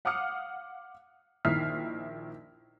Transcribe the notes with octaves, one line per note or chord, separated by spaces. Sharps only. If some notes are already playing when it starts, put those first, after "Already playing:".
F5 F#5 D6 D#6 F6 C#7
A#1 D#3 E4 F6 B6 C7